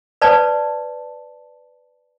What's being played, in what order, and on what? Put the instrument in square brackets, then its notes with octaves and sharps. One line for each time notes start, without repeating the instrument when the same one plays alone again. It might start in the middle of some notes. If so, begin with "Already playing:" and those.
[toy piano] B4 C5 D5 A5